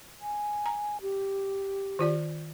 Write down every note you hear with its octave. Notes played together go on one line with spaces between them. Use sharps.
G#5
A#5
G4
D#3 F4 D5